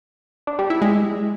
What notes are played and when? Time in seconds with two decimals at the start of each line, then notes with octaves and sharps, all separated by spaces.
0.47 D4
0.59 G3
0.70 E4
0.82 G#3